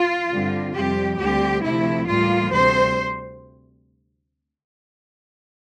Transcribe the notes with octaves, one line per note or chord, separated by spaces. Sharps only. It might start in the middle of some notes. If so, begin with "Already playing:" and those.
Already playing: F4
G2 D3 G3 C4
F2 C3 G3 C4 G4
D2 D3 G3 C4 G4
D2 C3 F3 A3 E4
A2 E3 G3 A#3 F4
D2 C3 G3 C4 C5